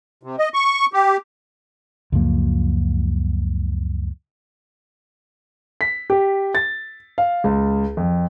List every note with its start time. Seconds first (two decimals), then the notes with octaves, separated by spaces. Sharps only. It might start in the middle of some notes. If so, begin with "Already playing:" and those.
0.23 C3
0.39 D#5
0.54 C#6
0.93 G4
2.12 C#2 F#2 F3 A#3
5.81 B6
6.10 G4
6.55 A6
7.18 F5
7.44 C#2
7.97 F2